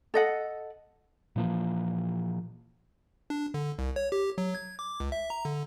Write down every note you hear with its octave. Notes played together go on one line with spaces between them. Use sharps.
A4 D#5 F#5
A#2 E3 F3 A#3
D4
D3
C2
C#5
G4
F#3
G#6
D6
C#2
E5
A#5
D3